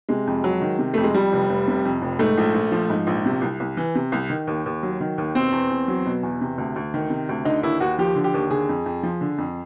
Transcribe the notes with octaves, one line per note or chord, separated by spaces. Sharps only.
C3 G#3
F2
F#3
D#3
C3
F2 A3
G#3
F2 G3
F1
F1
C3
F2
F1
G#2 A3
A#1
A#1
F3
G#2
A#1
C3
C2
C2
E3
C3
C2
D#3
D#2
D#2
F#3
D#3
D#2
B2 C4
E2
E2
F#3
B2
E2
C3
D2
D2
D#3
C3
D2
D3 D#4
D#2 E4
D#2 F#4
F3 G4
D3
G4
D#2
D3 G#4
F2
F2
F3
D3
F2